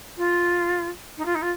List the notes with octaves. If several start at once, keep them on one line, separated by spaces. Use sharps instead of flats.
F4
D#4
F4
D#4
F4